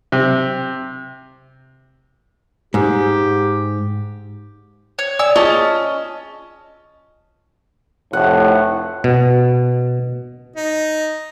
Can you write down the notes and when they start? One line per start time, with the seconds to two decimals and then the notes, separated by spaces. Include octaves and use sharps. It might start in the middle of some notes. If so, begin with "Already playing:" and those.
0.12 C3
2.74 G#2 G4
4.99 C#5
5.19 D5 G#5 D#6 E6
5.36 C#4 F4 G#4 D#5 A5
8.13 F1 A2 F#5
9.04 B2
10.56 D#4